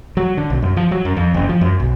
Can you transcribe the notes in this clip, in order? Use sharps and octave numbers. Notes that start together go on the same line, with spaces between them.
F#3
D3
B1
F#2
F3
F#3
F#2
F2
F#1
F3
F#2
B1